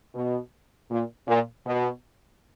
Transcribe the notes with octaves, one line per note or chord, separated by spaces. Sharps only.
B2
A#2
A#2
B2